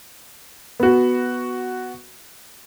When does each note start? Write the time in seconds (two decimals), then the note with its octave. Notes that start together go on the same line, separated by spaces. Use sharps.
0.80 B3 F#4